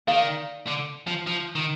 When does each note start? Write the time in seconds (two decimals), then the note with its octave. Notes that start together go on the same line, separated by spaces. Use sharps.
0.07 D#3 D5 F5
0.67 D3
1.07 F3
1.27 F3
1.55 D#3